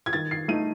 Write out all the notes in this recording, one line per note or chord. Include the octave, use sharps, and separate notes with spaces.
G#6
D#3 A6
C7
A3 D#4 D#7